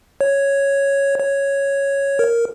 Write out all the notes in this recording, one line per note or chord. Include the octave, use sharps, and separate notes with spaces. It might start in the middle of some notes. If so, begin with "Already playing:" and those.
C#5
C#5
A#4